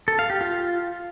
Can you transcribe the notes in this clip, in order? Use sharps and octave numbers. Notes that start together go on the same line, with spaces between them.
A4
F5
G4
F4